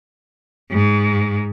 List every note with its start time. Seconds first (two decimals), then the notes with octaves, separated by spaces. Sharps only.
0.71 G#2